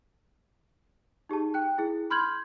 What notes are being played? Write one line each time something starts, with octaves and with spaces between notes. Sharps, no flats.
D#4 G4 G#4 A5
G5 F#6
E4 G#4
B5 C6 F6 G6 G#6 F#7